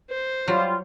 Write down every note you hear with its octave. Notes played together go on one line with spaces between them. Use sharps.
C5
F#3 G3 F4